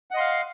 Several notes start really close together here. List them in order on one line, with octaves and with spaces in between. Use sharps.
F#5 D#5 C6 F5